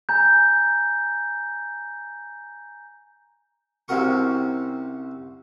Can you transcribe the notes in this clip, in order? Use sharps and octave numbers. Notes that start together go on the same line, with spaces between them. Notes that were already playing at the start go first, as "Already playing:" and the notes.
G#5 A#5 G6
C2 C3 C#4 F#4 A#4 C#6